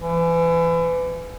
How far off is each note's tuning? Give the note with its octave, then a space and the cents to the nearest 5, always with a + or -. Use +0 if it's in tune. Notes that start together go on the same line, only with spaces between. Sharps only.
E3 +30